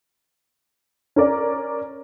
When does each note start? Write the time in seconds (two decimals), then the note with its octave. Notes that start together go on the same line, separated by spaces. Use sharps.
1.16 C#4 A#4 D5